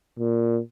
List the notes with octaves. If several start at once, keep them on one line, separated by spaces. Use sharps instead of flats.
A#2